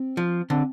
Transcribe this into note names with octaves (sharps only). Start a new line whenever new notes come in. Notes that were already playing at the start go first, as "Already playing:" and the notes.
Already playing: C4
F3
D3 C4